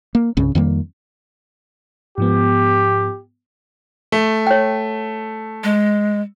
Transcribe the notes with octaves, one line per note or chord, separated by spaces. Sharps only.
A#3
C2 G2 C#3 C#4
F2 D#3 G3 A#3
G#2 F3 B3 G4
A3
C#5 G5
G#3